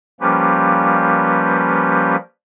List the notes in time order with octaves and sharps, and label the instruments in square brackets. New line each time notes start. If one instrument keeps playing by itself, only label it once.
[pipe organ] F3 G3 A#3 C#4 G4 B4